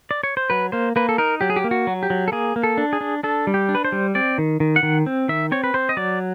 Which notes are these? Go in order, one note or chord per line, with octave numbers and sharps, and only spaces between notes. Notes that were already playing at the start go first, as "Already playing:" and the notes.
D5
C#5
C5
F#3 B4
A#3 C5
A#3 B4
A4
D#4 A#4
F#3 G4
G#4
G4
A#3
F#4
F#3
G4
F#3
A4
A#3 G#4
A#3
A4
D4
G#4
D4
D4 A4
G3
G4
D4
B4
C5
G3
C4 D5
D#3
D#3
F#5
D#3
C4
D#3 E5
C4 C#5
B4
C4 C5
D#5
F#3 D5